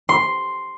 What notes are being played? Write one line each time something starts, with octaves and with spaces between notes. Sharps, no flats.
C6